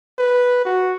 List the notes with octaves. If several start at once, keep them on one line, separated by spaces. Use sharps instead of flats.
B4
F#4